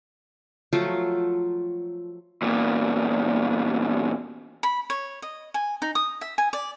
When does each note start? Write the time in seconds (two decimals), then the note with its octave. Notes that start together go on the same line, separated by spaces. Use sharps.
0.73 F3 F#3 A3 F4
2.42 E2 A#2
4.63 B5
4.90 C#5
5.22 D#5
5.54 G#5
5.82 D#4
5.95 D#6
6.21 E5
6.38 G#5
6.53 D5